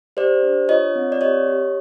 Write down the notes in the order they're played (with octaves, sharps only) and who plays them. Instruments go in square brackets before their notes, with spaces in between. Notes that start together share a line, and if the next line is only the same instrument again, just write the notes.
[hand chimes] G4 C5 D5
D4
F4 C#5 D#5
C4
D5
G4 C#5 D#5
G4